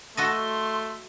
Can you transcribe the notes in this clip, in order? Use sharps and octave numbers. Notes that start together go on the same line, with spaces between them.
A3 F#4 A4 D#5 C6